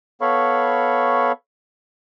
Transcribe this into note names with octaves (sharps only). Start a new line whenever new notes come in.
B3 A4 C#5 F5 B5 C#6